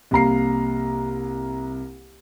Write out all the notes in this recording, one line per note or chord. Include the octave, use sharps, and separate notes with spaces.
C2 A#3 A#5 C7